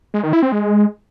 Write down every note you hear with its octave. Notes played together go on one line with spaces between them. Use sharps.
G#3
D#3
E4
C4
G#3